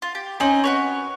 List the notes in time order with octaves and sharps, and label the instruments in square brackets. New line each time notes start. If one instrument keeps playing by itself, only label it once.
[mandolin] F4
G4
[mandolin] C4 D#4 D#5 [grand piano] C#4 G#5 F#7
[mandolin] F#4 B4 C#5